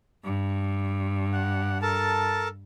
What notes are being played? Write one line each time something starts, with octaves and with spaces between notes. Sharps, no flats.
G2
F#5
A4 A#4 A5